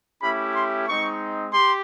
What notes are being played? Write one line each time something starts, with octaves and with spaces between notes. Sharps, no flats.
A3 C#4 E4 G4 B5
C6
G#3 C4 D#4 C#6
G4 C6